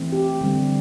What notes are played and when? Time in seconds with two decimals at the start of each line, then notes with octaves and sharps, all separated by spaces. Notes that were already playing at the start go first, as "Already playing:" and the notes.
Already playing: E3 A3 C4
0.12 G4
0.41 D3 G3 C4